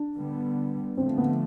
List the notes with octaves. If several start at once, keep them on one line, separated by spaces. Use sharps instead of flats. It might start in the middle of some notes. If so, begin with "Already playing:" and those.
Already playing: D4
D3 G3 B3
D3 F3 A3 C4
B3